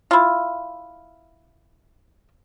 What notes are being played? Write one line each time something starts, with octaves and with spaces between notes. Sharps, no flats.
E4 F4